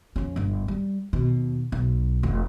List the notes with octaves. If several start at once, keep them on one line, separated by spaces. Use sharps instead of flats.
F2 C#4
G1 G2
G3
D#2 B2
B1
F1